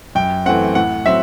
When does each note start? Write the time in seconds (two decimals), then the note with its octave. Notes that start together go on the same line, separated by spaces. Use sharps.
0.15 F#2 G5
0.46 E3 A3 C4 F#5
0.75 A2 F#5
1.06 F#3 C4 E5